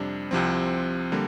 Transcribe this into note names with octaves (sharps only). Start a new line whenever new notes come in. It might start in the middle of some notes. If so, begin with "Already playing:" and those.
Already playing: F2 C3 G3 D4
C2 C3 F3 C4
D3 G3 A#3